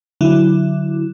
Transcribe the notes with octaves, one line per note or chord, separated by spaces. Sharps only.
D3 F#3 E4